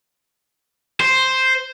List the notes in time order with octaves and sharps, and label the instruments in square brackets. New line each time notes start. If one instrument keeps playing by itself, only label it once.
[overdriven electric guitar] C5